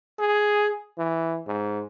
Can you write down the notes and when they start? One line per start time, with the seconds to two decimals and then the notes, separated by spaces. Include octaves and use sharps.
0.19 G#4
0.98 E3
1.47 G#2